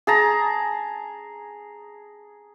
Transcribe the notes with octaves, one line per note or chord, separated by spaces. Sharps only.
G#4 A5 A#5